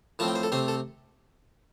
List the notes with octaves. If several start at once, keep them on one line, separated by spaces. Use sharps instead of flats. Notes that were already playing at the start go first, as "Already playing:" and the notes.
A2 F3 A3 C4 A5
G5
C5
A4
C3 A3 C4 C5
A4